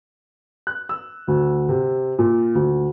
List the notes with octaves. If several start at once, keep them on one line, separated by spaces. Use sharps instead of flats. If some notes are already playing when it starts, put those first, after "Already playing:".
F#6
E6
D2
C3
A#2
D2